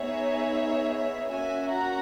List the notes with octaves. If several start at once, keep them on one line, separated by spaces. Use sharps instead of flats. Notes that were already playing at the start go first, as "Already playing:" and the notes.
Already playing: B3 D#4 G#4 C#5 E5
A#3 C#4 F#4 E5 G#5
F#5 A#5